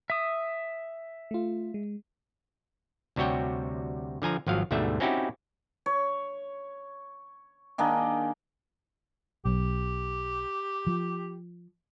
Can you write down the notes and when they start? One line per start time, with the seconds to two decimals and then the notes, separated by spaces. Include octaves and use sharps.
0.10 E5 D#6
1.31 A3 F4
1.74 G#3
3.16 D2 C3 G3 F#4 C#5 G5
4.22 D3 F3 G#5 A#5
4.47 G#1 F3 F#3 F5
4.71 D2 G#2 B2 G3 A3 E5
5.00 C4 C#4 D#4 E4 F#4 G4
5.86 C#5
7.78 D#3 A#3 D4 G#4
9.45 B1 G4
10.87 F3